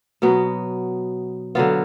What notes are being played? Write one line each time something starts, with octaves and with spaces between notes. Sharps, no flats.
B2 F#3 B3
D3 F#3 B3 F4